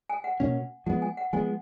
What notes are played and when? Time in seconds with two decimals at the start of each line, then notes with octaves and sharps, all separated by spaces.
0.10 G#5
0.24 F#5
0.40 B2 A#3 C#4
0.86 F3 G#3 B3 F#5
1.02 G#5
1.17 F#5
1.33 F3 G#3 B3 G#5